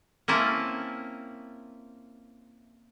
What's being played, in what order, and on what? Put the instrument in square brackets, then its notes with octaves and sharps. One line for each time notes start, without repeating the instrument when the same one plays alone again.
[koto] A#3 C4 C#4 E4 A5